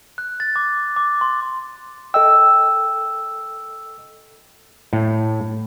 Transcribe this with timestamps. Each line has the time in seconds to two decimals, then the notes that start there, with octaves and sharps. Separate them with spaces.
0.18 F#6
0.40 A6
0.56 D6
0.96 D6
1.21 C6
2.14 A4 D#5 G5 E6
4.93 A2